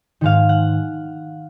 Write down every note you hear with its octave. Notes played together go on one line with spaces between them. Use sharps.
G#2 D#3 G#3 F5
F#5